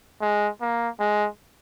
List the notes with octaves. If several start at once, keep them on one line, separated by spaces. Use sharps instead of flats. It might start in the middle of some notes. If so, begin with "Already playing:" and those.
G#3
A#3
G#3